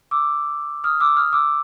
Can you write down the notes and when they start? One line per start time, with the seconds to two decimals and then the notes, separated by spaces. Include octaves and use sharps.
0.11 D6 E6
0.84 D#6 F6
1.00 D6 E6
1.16 D#6 F6
1.33 D6 E6